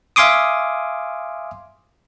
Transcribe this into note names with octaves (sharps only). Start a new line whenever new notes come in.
E5 F5 G#5 C6 D6 D#6